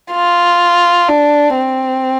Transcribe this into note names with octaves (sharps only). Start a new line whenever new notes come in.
F4
D4
C4